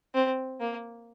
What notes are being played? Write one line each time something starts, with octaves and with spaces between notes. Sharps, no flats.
C4
A#3